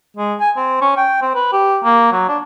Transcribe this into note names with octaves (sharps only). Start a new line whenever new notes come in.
G#3
G#5
C4
C#4
G5
C4
B4
G4
A#3
F#3
D4